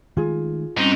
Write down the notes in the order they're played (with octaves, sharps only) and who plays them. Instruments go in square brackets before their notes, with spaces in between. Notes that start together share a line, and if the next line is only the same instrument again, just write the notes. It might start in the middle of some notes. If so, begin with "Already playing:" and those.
[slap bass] D#3 G#3 A3 [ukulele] F4 G#4
[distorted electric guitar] G#2 D#4 [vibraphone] G3 C4 C#4